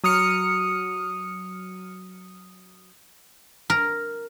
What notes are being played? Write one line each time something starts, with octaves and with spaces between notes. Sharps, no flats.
F#3 D#6 F6 C#7
A#4